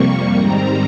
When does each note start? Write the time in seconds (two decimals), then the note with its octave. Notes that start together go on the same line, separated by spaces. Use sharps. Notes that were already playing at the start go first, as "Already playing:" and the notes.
Already playing: F2 C3 G3 A#3 C#6
0.35 G#2 D#3 G3 C4 A#5